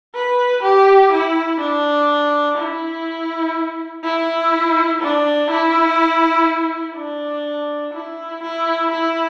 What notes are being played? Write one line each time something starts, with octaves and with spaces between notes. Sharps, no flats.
B4
G4
E4
D4
E4
E4
D4
E4
D4
E4
E4
E4